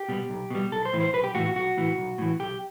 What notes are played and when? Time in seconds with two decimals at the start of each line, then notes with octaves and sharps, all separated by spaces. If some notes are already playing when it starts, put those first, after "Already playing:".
Already playing: G4
0.09 B2 G3
0.30 B1
0.50 B2 G3
0.72 B1 A4
0.85 C5
0.93 A2 E3
1.00 C5
1.13 B1 B4
1.24 G4
1.35 A2 E3 F#4
1.46 F#4
1.56 B1 F#4
1.77 A2 E3
1.98 B1
2.18 A2 E3
2.40 B1 G4